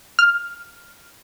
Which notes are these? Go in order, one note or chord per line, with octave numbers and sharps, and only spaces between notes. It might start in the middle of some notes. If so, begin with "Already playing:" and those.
F6